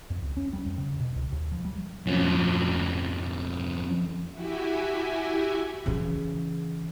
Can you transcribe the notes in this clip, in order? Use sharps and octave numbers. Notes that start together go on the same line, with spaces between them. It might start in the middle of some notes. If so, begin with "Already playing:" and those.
F2
C#2
C#4
G3
F2
C#3
B2
C#2
D#2
F3
G3
F2 C#4
E4 F#4 G4 E5 G#5
C#3 E3